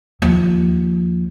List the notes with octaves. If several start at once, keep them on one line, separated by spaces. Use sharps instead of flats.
D#2 F3